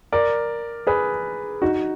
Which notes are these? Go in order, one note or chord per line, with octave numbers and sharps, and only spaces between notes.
A#4 D5
G#4 B4
D#4 F#4